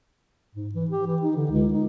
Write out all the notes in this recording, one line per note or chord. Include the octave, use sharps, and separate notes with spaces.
G#2
E3
G4
E3
D#4
D3
C#2
D#4